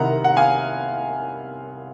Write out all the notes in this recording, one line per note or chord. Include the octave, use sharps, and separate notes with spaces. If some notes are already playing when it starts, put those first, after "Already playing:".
Already playing: C2 C3 D#3 F#5 A#5
F#5
F5 G#5